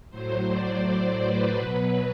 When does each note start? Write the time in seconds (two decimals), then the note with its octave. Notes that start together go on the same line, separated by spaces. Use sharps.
0.10 A2 F#3 C5
0.47 D5
1.21 B4
1.56 B2 F#3